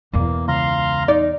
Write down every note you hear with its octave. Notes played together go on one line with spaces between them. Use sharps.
E2 B2 A#3
C#2 F5 A#5 C6
D#4 D5